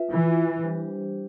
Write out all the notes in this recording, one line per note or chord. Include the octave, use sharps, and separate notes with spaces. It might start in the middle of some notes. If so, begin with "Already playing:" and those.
Already playing: F4 B4 E5
E3
G3 D4 G4 C5